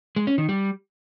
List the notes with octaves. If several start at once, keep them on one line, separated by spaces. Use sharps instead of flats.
G#3
C#4
D#3
G3